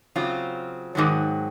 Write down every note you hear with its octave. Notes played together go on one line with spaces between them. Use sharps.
C#3 F#3 C4 F4
G#2 D#3 F#3